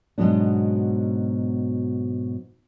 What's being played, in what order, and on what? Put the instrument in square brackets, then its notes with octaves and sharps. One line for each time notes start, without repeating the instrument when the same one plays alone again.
[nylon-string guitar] G#2 B2 D3 F#3 B3 D4